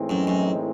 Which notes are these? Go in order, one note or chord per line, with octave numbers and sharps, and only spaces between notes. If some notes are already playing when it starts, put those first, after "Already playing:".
Already playing: A2 E3 G#3 C4 D#4
F#2
F#2